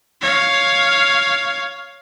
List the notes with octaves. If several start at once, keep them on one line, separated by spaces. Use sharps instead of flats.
C#5 F5